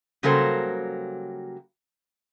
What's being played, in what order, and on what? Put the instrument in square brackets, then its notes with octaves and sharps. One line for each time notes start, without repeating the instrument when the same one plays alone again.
[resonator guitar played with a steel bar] C#3 F#3 G3 A#3 A4 C5